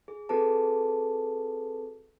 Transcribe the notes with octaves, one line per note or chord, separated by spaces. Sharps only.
G#4
C4 F#4 G#4 A4 B4 A5